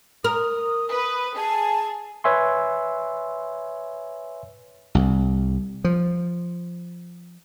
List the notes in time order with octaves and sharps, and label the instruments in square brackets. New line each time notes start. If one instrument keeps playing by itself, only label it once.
[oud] A#4 [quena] D#6
[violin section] B4
[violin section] G#4 [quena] A5
[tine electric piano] B4 C#5 E5 G#5 C6
[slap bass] C2
F3